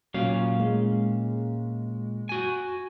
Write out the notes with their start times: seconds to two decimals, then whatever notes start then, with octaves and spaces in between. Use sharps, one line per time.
0.14 A#2 F#3 C#4 F5
0.60 G#3
2.29 F#4 G#5